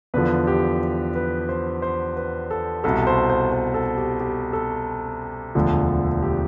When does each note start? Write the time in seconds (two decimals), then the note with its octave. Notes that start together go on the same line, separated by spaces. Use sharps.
0.14 E2 D3 F3 B4
0.47 G4
1.15 B4
1.49 C5
1.82 C5
2.16 B4
2.51 A4
2.84 C2 B2 A4
3.07 C5
3.30 C5
3.52 C5
3.74 A4
3.97 G4
4.20 G4
4.53 A4
5.55 E1 D2 D3 F3
6.22 G4